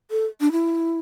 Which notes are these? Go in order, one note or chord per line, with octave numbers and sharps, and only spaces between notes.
A4
D4
E4